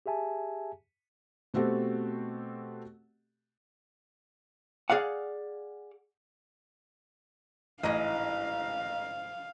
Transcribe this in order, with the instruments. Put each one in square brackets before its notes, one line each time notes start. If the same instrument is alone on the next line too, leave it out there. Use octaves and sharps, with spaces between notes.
[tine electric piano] G4 G#4 E5 G#5 A5
[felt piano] B2 A3 C4 F#4 G4 A4
[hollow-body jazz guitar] G#4 D5 F5 F#5
[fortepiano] A1 [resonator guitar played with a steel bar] G#2 E4 D#5 [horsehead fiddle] F5